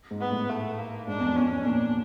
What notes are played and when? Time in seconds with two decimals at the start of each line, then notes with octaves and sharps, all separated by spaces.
0.11 G#2
0.21 B3
0.30 A2
0.50 A3
0.78 A#3
1.08 G#2 D4
1.20 E2
1.26 F2
1.36 C#4
1.46 E2
1.65 A#2 D4